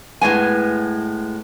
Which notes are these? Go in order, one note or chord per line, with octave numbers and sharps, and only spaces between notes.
A2 G#3 B3 G#5